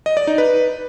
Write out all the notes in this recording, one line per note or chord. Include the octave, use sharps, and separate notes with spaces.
D#5
D5
D#4
B4